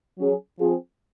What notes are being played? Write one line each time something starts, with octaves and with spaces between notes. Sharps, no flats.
F#3 C#4 G#4
F3 C4 F4 G#4